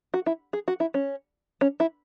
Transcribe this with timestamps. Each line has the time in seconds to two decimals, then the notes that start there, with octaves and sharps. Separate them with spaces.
0.14 F#4
0.26 E4
0.53 G#4
0.68 F#4
0.80 E4
0.94 C#4
1.61 C#4
1.80 E4